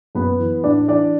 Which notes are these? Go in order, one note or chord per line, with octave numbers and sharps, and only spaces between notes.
F#2 B3 B4
E3
A2 D4 D5
E3 D4 D5